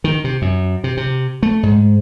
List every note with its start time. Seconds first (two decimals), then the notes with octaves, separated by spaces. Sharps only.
0.04 D#3
0.24 C3
0.42 F#2
0.84 C3
0.97 C3
1.43 A3
1.63 G#2